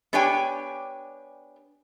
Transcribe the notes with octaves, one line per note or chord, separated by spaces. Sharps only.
B3 D4 G4 C#5 G5 G#5